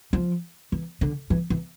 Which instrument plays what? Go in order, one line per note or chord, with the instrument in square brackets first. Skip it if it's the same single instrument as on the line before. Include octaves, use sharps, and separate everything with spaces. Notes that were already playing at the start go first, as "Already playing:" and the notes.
[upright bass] F3
E3
D3
E3
E3